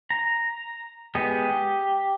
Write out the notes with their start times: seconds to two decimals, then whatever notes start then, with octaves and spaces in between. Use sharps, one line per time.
0.10 A#5
1.15 G#3 B3 G4 D#5
1.50 G4